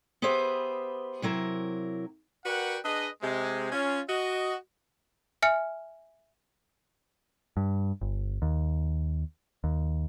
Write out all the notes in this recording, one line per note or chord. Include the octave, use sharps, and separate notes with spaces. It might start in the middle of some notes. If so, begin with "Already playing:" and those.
B3 G4 G#4 B4 C5 E5
C3 F#3 E4 A#4
F#4 A#4 B4 D5 F#5 G5
D4 G#4 B4 D#5
C3 G#3
C#4 F4
F#4 D#5
E5 G#5 F6 C#7
G2
G1
D#2
D#2